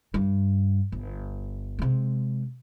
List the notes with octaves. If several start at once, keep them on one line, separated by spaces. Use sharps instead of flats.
G2
G1
C3 G#3